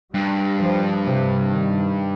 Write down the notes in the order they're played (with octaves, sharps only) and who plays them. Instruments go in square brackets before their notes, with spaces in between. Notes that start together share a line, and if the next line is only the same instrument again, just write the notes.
[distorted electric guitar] G2 [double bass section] G3
[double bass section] F3
C3
D#3